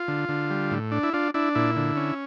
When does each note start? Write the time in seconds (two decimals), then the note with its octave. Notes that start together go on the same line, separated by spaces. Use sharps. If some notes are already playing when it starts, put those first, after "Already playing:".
Already playing: F4
0.08 D3
0.29 D3
0.50 G3
0.71 A2
0.92 D4
1.03 E4
1.13 D4 F4
1.34 D4 E4
1.55 A#2 E4
1.76 D3
1.97 C#4